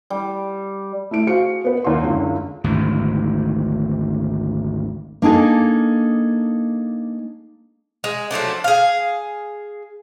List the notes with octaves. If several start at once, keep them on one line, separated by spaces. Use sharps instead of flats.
G3
A3 E4 D7
F#4 G#4 C5 F5 C#7
B3 B4
D#2 D5 F#5 C6
F#1 C#2 D3
G#1 D2 G#2
A#3 D4 D#4 G#4 A4
G#3
F3 F#3 A3 D4
G#4 F5